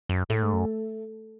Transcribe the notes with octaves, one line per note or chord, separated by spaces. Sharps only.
F#2
A2 A3
G#2
F#2